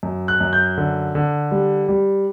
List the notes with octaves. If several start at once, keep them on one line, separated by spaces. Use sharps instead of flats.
F#2
F#6
F#2
G6
D3
D3
G3
G3